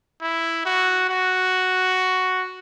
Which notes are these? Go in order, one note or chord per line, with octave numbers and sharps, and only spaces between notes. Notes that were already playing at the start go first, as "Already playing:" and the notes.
E4
F#4
F#4